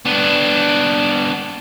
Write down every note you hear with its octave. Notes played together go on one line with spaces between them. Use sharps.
B3 D4